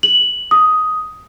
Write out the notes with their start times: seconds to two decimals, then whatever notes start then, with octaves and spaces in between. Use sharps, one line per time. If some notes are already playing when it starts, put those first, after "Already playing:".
0.03 F#7
0.51 D#6